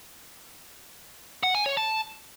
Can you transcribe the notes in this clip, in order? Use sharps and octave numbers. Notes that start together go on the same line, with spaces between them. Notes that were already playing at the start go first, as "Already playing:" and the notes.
F#5
G#5
C#5
A5